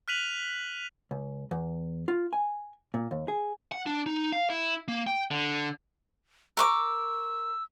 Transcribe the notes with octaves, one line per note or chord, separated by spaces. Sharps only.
F6 F#6 B6 D#7 F7 F#7
C#2
E2
F4
G#5
A#2
D#2
G#4
F#5
D4
D#4
F5
E4
A#3
G5
D3
A#4 C#6 D6 E6